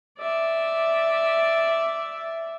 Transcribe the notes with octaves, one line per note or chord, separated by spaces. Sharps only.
D5 E5